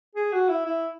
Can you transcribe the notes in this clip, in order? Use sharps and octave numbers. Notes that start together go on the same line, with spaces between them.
G#4
F#4
E4
E4